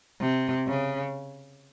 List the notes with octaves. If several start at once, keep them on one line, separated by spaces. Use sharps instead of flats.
C3
C#3